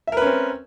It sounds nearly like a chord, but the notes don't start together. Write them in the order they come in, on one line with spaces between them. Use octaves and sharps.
E5 A#4 B4 C#4 C4